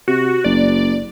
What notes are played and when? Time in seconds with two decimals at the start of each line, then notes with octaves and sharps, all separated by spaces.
0.08 C3 F#4
0.44 F#1 D5